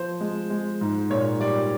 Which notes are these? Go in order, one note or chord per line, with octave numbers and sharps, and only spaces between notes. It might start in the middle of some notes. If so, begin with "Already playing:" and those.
Already playing: F3 C5
G#3
G#3
G#2
A#2 C#5
G3 D5